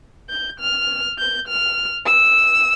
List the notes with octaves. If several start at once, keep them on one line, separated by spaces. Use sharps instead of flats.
G6
F6
G6
F6
E6